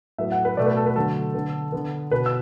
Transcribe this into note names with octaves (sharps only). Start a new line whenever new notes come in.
A2 F#3 B3 E5
F#5
B4
B2 A3 D5
B4
A4
B4
D3 F#3 A3 A4
D3 B3
D3 B3
B2 B3 B4
E6